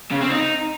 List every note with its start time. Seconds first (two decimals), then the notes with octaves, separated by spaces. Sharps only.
0.11 C#3
0.21 C4
0.30 D#4